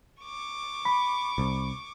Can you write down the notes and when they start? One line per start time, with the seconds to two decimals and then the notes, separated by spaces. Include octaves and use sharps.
0.23 C#6 D6
0.85 B5
1.38 C2